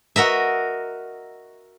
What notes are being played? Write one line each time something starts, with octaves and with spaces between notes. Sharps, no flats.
F#4 A#4 D#5 E5